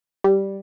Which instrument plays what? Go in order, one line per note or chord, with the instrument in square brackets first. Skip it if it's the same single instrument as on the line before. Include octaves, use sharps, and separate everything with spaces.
[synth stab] G3